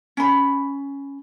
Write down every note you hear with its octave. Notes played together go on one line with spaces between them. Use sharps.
C#4 B5